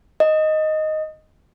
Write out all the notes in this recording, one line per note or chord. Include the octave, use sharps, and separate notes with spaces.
D#5